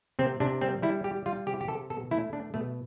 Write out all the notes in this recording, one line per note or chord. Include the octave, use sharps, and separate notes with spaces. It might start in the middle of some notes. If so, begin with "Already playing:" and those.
C3 C4
C3 D4
G3 C4
G3 E4
G3 G4
G3 F4
C3 G4
G4
C3 A4
B2 A4
A3 E4
A3 D4
B2 A3